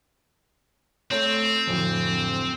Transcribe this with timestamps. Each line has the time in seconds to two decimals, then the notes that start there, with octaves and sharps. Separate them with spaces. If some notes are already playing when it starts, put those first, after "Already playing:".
1.11 A3 C4 C#5
1.67 D1 F2